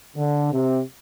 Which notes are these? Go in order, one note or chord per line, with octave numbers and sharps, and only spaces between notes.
D3
C3